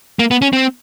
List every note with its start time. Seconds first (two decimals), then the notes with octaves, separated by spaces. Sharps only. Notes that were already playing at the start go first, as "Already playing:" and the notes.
0.19 A#3
0.31 B3
0.42 C#4
0.53 C4